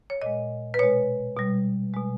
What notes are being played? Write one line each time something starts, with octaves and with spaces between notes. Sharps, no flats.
C#5
A#2 G#3 D#5
B4
B2 G#3 C#5
B2 G3
B2 G#3